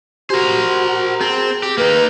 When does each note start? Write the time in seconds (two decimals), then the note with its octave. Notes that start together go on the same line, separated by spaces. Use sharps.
0.30 F#4 G4 A#4 C5
1.21 C4 G#4
1.63 G4
1.78 A#3 D#4 B4